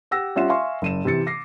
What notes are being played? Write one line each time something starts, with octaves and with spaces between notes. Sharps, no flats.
G4 F#5 E6 A#6
G3 C#4 F4 E5 F#5 E7
E5 F5 G#5 C6 C#6
F#1 D#7 E7
C3 E3 A6 C#7
D6 A#6 C7